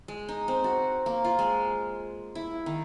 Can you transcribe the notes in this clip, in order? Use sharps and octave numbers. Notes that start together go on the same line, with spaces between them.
G#3
D#4
C4
F#4
A#3
F4
G#3
E4
D#3